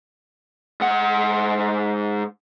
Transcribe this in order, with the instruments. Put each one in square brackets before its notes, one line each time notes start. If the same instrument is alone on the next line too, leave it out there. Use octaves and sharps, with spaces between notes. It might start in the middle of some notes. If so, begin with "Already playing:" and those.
[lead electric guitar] G#2 F#5